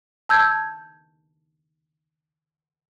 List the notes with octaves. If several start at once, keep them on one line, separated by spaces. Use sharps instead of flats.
A5 E6 G6 G#6